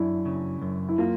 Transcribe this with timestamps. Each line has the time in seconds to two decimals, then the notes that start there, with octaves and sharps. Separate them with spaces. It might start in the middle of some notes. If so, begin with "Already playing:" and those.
Already playing: F#2 D4 E4
0.25 C#3
0.62 F#2
0.89 E4
0.98 A#3 F4